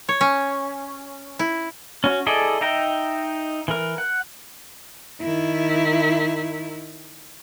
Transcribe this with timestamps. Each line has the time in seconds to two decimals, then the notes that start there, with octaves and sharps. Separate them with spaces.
0.09 C#5
0.21 C#4
1.39 E4
2.04 C#4 F#4
2.26 E4 G#4 A4 D5 D#5
2.61 D#4 D#5 E5 G5 A#5
3.68 E3 A#4
3.98 F#5
5.21 D#3 E4